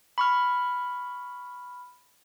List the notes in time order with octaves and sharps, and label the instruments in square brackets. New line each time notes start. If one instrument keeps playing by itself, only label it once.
[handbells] B5 C#6 F6